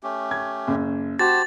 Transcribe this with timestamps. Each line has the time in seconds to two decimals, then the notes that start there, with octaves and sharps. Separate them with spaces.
0.03 A3 C#4 G4
0.31 G#6
0.67 F#1
1.19 F#4 G4 C5 A5 A6